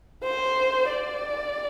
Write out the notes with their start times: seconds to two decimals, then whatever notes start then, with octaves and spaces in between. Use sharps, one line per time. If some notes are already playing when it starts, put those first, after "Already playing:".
0.23 C5
0.89 D5